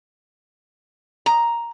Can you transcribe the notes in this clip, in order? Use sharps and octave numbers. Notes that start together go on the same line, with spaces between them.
A#5